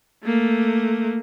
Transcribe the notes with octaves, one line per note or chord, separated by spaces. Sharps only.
A3 A#3